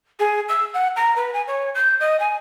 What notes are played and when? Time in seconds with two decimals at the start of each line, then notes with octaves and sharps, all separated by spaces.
0.19 G#4
0.49 E6
0.74 F#5
0.96 A#5
1.16 B4
1.34 G#5
1.47 C#5
1.75 G6
2.00 D#5
2.20 G#5